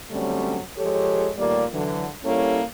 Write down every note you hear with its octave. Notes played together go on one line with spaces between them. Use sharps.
D3 F#3 G3 A3 C4 C#4
F3 G#3 G4 A4 C#5
D#2 A#2 G3 A3 A#3 D5
D3 E3 F#3
G3 A#3 C#4 E4 A4 C#5